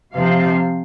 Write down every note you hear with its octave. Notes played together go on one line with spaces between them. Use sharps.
C3 F3 C4 F5